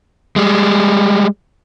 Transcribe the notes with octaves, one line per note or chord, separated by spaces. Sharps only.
G3 G#3